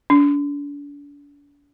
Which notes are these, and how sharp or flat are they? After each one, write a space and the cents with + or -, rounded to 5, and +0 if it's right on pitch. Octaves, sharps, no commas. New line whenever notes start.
D4 -40